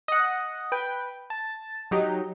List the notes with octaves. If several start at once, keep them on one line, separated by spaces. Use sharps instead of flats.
D#5 F#5
B4 G5
A5
F#3 D#4 G4